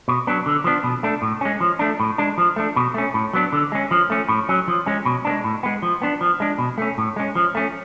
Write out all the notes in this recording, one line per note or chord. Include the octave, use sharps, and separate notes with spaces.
B2
F#3 B3 D4
D3
F3 B3 D4
B2
A3 D4
A2
G#3 C#4
F3
A3 D4
A2
G#3 D4
F3
A3 D4
B2
A3 C#4
A2
F#3 B3 D4
D3
G#3 C#4
F3
A3 C#4
A2
F#3 C#4
F3
G#3 C#4
B2
G#3 B3 D4
A2
G#3 B3
F3
B3 D4
F3
G#3 D4
B2
A3 C#4
A2
G#3 C#4
F3
A3 C#4